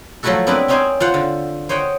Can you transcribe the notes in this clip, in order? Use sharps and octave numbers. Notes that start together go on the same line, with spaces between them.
F3 F#3 A3 E4 F#4 A4
B3 C4 D4 E4 A#4 B4
C4 C#4 D#4 C5 D5 G#5
F4 C5 F#5
D3
C5 C#5 D#5 F#5 G5